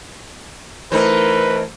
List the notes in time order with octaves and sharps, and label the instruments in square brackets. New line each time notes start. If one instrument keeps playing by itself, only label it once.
[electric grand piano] E3 A3 E4 [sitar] C4 D#4 [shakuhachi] A#4 [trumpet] B4